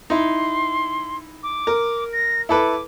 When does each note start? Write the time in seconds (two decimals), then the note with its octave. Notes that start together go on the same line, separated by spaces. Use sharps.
0.10 D#4 E4 C6
1.42 D6
1.67 A#4
2.12 A#6
2.49 E4 A4 B4 D6